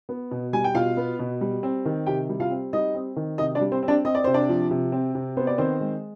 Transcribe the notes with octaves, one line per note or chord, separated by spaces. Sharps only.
B3
B2
G3 G#5
G5
B2 F4 F5
B3
B2
G3
C4
D#3
C3 G4 G5
G3
F4 F5
C4
G3 D#4 D#5
C4
D#3
C3 D#4 D#5
D4 D5
G3
C4 C5
C4
D4 D5
C4 D#5
D5
C3 C5
D4 D5
F3
C3
C4
C3
B3 C5
D5
D#3 C4 C5
G#3